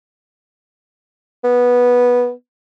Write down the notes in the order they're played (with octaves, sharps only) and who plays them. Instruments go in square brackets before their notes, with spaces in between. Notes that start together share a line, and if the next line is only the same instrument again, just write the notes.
[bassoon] B3